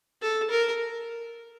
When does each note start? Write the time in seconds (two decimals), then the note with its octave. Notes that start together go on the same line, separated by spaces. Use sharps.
0.22 A4
0.50 A#4